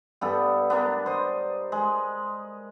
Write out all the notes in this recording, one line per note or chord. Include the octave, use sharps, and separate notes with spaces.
G2 B3 A4
B3 D4 A#4
C5 D#5
G#3